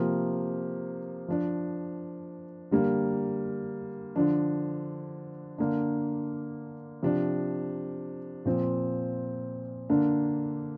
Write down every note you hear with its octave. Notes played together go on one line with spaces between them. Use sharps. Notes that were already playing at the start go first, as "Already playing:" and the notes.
Already playing: C3 F3 A#3
F3 D4
D3 G3 A#3
D3 F3 D4
D3 A#3 D4
C3 F3 D4
A#2 F3 C4
D3 A#3 D4